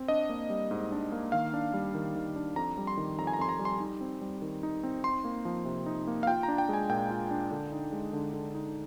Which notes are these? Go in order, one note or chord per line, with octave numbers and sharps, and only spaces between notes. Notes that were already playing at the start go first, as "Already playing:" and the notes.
Already playing: C4
D4 D#5
A#3
G3
G#2
D4
A#3
D#3 F5
D4
G3
D#3
D#3
D4
F2 A#5
G3
C6
D#3
F2 A#5
G#5
A#5
F2 C6
A#5
G3
C6
D#4
C4
G3
D#3
D#4
C4
D#4 C6
A#3
F3
C3
D#4
A#3
F5
F4 G5
A#5
D4
G5
G#3 G#5
A#2 G5
F4
D4
D3
D#4
G#3
D3
D3
D#4